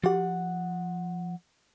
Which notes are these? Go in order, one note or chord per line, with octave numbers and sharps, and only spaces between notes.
F3 F#4 G4 F#5